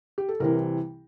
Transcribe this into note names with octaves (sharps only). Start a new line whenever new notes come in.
G4
A4
C2 C3 E3 A#4